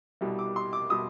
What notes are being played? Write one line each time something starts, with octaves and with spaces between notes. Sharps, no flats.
C2 B2 G3
D6
C6
D6
B2 G3 D#6